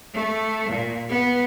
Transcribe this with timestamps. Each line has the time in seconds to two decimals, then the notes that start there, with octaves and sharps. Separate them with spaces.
0.13 A3
0.69 A#2
1.09 B3